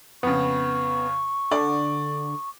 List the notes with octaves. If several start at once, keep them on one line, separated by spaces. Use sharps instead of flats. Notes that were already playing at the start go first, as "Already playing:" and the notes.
F2 C#3 B3 C#6
D3 D5